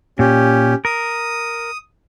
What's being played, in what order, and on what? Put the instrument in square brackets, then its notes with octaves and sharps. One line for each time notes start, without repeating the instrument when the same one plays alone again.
[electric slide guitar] A#2 [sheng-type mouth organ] C#4 G4
[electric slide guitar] A#4 [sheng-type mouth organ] D#6